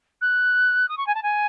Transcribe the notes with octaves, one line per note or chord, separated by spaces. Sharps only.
F#6
D#6
C#6
G#5
A5
G#5